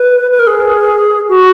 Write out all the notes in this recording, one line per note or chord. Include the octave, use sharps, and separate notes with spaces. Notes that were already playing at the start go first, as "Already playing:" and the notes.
Already playing: B4
B4
A#4
G#4
F#4